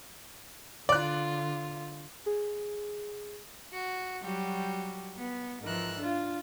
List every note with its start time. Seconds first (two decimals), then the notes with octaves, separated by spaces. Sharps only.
0.89 D3 F4 D5 F#6
2.26 G#4
3.72 F#4
4.22 F#3 G3 F#4 G4
5.17 B3
5.63 G#2 E3 F3 A#4 E6 F#6
5.99 D4 F4